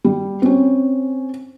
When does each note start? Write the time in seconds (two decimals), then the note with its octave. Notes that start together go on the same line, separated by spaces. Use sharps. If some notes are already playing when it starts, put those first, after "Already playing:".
0.04 G3
0.42 C4 C#4